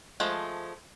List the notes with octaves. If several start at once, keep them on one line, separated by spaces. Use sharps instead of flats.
F3 G#3 A3